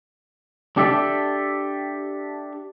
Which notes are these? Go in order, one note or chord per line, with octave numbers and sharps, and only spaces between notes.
D4 G4 A4 E5